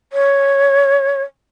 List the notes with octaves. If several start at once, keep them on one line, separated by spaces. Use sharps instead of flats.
C#5